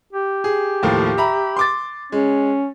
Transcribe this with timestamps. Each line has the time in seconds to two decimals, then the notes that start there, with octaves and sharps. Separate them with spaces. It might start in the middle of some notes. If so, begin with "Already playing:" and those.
0.13 G4
0.44 G#4
0.83 D#2 A2 F3
1.18 E5 A#5 B5
1.57 C6 D6 A6
2.12 G#3 C#4